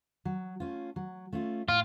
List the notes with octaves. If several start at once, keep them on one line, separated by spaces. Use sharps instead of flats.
F#3
A3 C#4 F4
F#3
A3 C#4 F4
A2 F4